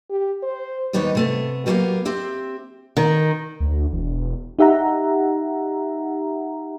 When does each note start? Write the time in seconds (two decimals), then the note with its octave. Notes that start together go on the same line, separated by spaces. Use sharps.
0.10 G4
0.43 C5
0.93 D#2 G3 B3 D#4 G4 C#5
1.15 C3 A3 B3
1.66 F#3 G3 A#3 B3 G4 F5
2.05 C4 G4 E5
2.97 D#3
3.60 D2
3.93 E1
4.59 D#4 G4 E5 F#5 A#5